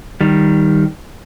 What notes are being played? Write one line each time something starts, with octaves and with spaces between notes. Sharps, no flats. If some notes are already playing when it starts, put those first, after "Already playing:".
D#3 G3